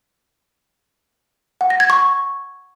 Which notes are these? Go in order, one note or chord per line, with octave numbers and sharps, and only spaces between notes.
F#5
A#6
G#6
C#6